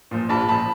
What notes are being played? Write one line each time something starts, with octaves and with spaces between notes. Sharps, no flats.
A#2 F3
A#1 A5 B5
A#2 F3 A5 B5